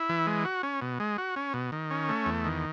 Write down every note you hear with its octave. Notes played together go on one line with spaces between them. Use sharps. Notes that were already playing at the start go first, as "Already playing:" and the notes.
Already playing: E4
E3
G#3
F#4
C#4
B2
G#3
F#4
C#4
B2
D#3
C#4
A3
E2
D#3